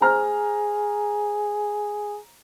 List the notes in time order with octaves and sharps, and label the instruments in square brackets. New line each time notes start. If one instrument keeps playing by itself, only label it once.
[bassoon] G#4 [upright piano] C5 A#5 F6